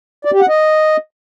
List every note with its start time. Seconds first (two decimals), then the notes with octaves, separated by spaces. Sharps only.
0.25 D5
0.33 G4
0.41 F#5
0.49 D#5